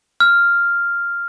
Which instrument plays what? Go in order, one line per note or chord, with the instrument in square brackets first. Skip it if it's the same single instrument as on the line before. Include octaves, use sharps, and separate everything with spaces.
[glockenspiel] F6